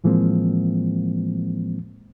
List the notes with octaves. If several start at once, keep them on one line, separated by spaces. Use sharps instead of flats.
A2 E3 F3 G#3 A#3 C4